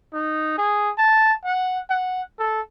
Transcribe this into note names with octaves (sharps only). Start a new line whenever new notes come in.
D#4
G#4
A5
F#5
F#5
A4